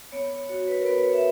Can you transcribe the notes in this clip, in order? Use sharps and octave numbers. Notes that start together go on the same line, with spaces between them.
B3 C#5
C#5
F#4 C#5
B4
A#4
B3 B4
B4
C#5
E5